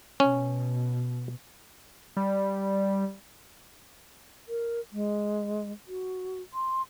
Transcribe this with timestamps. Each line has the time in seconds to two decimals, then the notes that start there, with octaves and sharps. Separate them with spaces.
0.20 B2 C#4
2.17 G3
4.48 A#4
4.92 G#3
5.88 F#4
6.54 C6